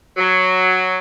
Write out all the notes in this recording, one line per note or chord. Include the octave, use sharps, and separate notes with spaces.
F#3